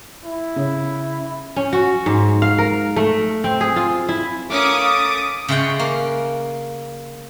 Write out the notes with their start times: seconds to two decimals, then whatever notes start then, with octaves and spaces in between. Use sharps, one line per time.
0.23 E4
0.56 C#3
1.56 C#4
1.73 F#4
2.06 G#2
2.42 F5
2.58 A#4
2.96 A3
3.44 C4
3.61 G#4
3.76 F4
4.09 E4
4.50 A3 A#3 C#4 D6 D#6
5.48 C#3 G#3 A3 F#5 G5
5.79 A#3